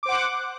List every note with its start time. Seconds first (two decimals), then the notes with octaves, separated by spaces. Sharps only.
0.03 D6
0.06 C5
0.09 F#5